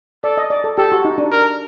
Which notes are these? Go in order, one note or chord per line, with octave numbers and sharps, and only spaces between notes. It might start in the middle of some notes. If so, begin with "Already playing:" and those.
A4 D5
D#5
D5
A4
G4 A4
F#4
D#4
D4
A#4